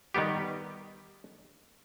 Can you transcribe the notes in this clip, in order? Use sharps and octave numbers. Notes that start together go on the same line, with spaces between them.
D#3 G3 B3 G4